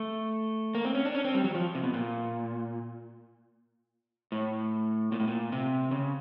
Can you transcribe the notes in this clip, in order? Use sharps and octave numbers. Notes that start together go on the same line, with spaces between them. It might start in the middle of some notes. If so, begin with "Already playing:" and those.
Already playing: A3
A#3
C4
C#4
D4
C#4
C4
G3
F#3
F3
C3
B2
A#2
A2
A#2
A2
A#2
C3
C#3